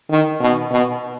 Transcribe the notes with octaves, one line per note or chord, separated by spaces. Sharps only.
D#3
B2
B2